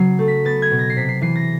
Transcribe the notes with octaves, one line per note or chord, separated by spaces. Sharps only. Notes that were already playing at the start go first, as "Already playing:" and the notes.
Already playing: C#3 F#3 C7
A3
B6
B3 A6
G#6
B2
A#6
C7
C3 B6
C7
E3 C7
A#6